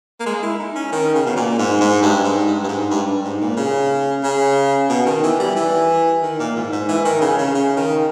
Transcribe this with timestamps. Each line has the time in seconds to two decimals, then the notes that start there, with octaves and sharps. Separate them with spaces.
0.20 A#3
0.26 G#3
0.43 E4
0.59 D#4
0.75 C#4
0.92 D#3
1.15 C#3
1.26 B2
1.37 A#2
1.58 G#2
1.81 G#2
2.03 G2
2.24 G#2
2.47 G2
2.64 G2
2.68 G#2
2.91 G2
3.07 G2
3.24 G#2
3.41 A#2
3.57 C#3
4.24 C#3
4.90 B2
5.06 D#3
5.23 E3
5.39 G3
5.56 E3
6.23 D#3
6.39 A#2
6.56 G#2
6.72 G#2
6.89 E3
7.05 D#3
7.21 C#3
7.38 C#3
7.55 C#3
7.77 D#3